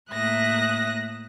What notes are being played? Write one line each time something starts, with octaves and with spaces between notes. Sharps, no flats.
A2 A#3 E5 D#6 F#6 A#6